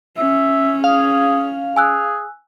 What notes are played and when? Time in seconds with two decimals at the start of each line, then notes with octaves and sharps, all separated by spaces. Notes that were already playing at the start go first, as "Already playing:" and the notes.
0.18 C#4 E5
0.84 G#4 F5
1.76 G#4 G#5 E6 F#6